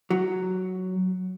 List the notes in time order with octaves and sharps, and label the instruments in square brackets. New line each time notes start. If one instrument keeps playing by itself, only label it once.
[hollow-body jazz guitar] F#3